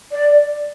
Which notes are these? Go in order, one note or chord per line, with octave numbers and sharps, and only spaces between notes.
D5